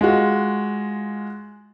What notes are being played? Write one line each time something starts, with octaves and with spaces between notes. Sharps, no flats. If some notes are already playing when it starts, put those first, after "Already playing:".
G#3 F4 F#4